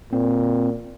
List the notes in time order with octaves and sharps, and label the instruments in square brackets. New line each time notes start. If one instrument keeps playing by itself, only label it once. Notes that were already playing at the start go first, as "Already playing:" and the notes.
[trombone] A#2 [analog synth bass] C4